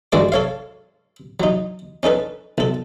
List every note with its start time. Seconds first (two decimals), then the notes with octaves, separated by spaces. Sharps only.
0.12 G2 D#3 G#3 F#4 D5 D6
0.32 A4 C#5 F5
1.40 F#3 D#4
2.03 C#4 D#4 A4 B4
2.58 B1 A4